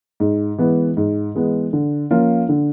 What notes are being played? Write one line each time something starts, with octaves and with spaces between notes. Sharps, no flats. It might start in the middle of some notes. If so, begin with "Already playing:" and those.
G#2
E3 G#3 B3
G#2
E3 G#3 B3
D3
F3 A#3 C#4 F4
D3